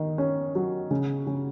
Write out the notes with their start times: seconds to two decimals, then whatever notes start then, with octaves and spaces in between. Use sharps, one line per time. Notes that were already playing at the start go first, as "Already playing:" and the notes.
Already playing: D#3
0.18 C#4
0.55 F#3
0.91 C#3
1.27 C#3